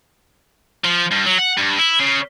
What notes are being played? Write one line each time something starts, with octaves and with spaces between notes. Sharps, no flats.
F3
G2
F#3
F#5
G2
E4
C#3